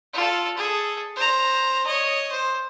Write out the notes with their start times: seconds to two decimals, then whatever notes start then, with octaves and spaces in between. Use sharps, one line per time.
0.13 F4 A4
0.57 G#4 A4
1.16 C5 A#5
1.86 C#5 D#5
2.31 C5